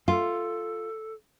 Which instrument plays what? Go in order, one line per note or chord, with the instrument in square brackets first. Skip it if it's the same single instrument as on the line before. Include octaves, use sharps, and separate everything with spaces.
[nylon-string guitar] F4 [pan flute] A4